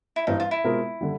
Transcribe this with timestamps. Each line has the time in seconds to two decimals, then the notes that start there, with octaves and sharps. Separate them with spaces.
0.16 E4
0.27 G2 E3 G3 C4 D#4
0.40 F4
0.51 E4
0.64 B2 G#3 C4 F4 A#4
1.01 D3 G3